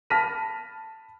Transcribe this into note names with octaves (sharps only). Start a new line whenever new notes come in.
A5 B5 F6 A#6 B6 D#7